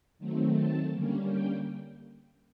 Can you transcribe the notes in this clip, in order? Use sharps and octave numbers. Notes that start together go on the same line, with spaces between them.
D#3 F#3 A3 C4
A5
D3 G3 A#3 C#4
G5